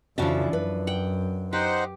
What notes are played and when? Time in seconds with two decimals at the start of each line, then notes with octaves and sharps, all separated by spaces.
0.18 F2 C#3 E3 F3 D4 F#4 E5
0.53 F#2 B4
0.87 F#5 G5
1.53 D#4 G4 C5 F#5